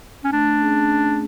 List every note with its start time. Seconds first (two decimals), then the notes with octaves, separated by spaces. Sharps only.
0.24 C#4
0.32 A3 D4
0.60 C#4 G#4
0.88 A3